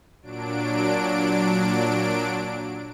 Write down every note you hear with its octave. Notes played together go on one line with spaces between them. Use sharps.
A#2 F#3 D4 D7